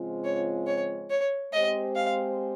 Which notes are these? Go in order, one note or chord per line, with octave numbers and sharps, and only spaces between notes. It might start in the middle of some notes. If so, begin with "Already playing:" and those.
Already playing: C#3 F3 G#3 C4 F4
C#5
C#5
C#5
G#3 C4 G4 C5 D#5
F5